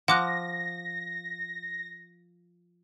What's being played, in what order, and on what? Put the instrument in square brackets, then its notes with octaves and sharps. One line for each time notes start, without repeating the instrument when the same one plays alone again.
[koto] F3 [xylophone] F#5 D6 F#6 [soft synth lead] A#6